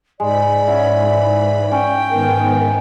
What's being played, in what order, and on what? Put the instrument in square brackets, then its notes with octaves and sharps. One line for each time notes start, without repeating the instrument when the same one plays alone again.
[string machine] G#2 B5 [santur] G#3 [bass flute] D5
[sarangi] C#4 [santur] E4 F#5
[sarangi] E3
[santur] C#4 [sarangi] G5
[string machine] G#2 D#3 B3 [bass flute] A#4